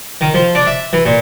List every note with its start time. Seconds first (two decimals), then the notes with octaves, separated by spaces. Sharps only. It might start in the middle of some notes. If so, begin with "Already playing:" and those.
0.21 D#3
0.34 F3
0.55 D4
0.67 E5
0.93 E3
1.05 A#2